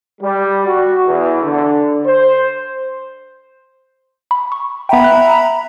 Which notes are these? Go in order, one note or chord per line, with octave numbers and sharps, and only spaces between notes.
G3
F#4
E2
D3
C5
B5
C#6
B3 E5 G5 A#5 B5
F#6